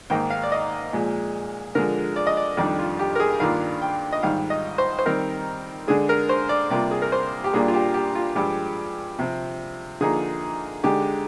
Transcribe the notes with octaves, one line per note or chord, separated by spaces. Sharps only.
G#2 D#3 A#3 D#4 G5
F5
D5
D#5
A#2 F3 G#3
D3 F3 G#3 A#4
D5
D#5
D5
F2 D#3 G3 D4 D5
F4
G4
A#4
G#4
G2 D#3 A#3 D4 F4 F5
G5
D#5
G#2 D#3 G3 F5
D#5
C5
C5
D#3 G3 C4 D#4 A#4
D3 G#3 D4 G#4
A#4
C5
D5
C3 G3 A#3 F4 D5
G#4
A#4
C5
G4
A#2 G3 A#3 D4 F4 G#4
F4
G4
G4
F4
G2 F3 G#3 G4
C3 F3 C4
D3 F3 A#3 D#4 G#4
D3 G#3 D#4 G4